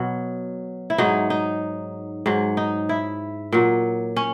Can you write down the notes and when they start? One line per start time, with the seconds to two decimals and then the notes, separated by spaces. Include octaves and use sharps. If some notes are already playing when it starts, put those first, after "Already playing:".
Already playing: B2 F#3
0.90 E4
0.98 G#2 F#3 D#4
1.30 D#4
2.26 G#2 F#3
2.57 D#4
2.89 E4
3.52 A#2 F#3
4.16 C#4